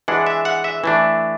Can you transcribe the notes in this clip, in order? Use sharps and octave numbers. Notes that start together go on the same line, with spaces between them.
E3 G#3 D4 F#5
E5
F#5
E5
E3 A3 D4